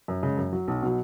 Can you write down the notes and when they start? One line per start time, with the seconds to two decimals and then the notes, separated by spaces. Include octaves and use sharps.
0.08 F#2
0.23 C#3 G#3
0.37 F#2
0.53 F#3
0.68 B1
0.82 B2 F#3